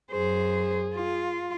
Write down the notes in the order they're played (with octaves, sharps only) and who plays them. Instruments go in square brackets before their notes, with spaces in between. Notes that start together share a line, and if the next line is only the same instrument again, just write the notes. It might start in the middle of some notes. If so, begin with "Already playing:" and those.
[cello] F#2 C5 [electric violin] G#4
[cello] F4